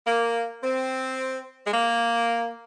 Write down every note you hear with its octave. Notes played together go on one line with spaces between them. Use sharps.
A#3
C4
G#3
A#3